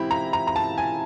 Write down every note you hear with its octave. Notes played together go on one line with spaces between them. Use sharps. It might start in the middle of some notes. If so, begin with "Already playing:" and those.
Already playing: E3 G#3 C4 E4 G4 B5
A#5
A#5
A#5
A5
G#5